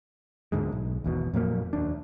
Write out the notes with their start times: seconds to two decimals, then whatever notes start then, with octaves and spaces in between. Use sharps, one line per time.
0.52 D2 G#2 D3 G#3
0.72 B1
1.04 G#1 E2 B2
1.34 F2 A#2 F#3 A#3
1.73 D#2 D4